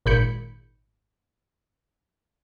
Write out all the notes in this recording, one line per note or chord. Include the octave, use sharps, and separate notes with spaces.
G#1 A#2 B5 G6 C#7